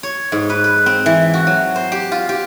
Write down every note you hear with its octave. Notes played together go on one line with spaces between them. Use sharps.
C#5
G#2
B4
B4
C4
E3
F#4
F#3
C5
G4
F4
G4